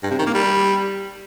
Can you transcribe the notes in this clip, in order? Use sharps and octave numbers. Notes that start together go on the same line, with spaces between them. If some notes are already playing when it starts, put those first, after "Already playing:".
G2
C3
D#3
A#3
G3